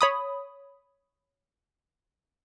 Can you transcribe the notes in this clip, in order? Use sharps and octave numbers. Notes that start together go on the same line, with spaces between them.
C#5 B5 D#6